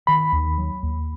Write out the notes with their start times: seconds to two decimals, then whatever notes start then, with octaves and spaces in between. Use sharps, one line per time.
0.07 D#3 B5
0.32 D#2
0.58 F#3
0.83 D#2